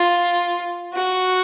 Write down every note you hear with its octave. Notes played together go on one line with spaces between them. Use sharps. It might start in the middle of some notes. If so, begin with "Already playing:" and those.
Already playing: F4
F#4